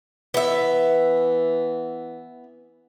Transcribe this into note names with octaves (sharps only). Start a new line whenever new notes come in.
E3 B3 E5